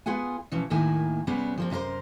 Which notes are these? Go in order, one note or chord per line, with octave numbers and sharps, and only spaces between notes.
B3 F4 G#4 F#5 G#5
B2 E3 F3 C#4
D#2 A2 D#3 A#3 E4 G#5
C3 G3 B3 C#4 G#4
F3 A#3 C4
F#2 C3 D#4 A#4 C5